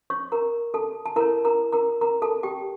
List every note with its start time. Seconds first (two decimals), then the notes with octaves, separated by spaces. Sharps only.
0.10 C#5 C#6
0.32 A#4 A#5
0.74 A4 A5
1.06 A5
1.16 E4 A4 A#4 C#5 A#5
1.45 A#4 A#5
1.72 A#4 A#5
2.01 A#4 A#5
2.22 A4 A5
2.43 G4 G5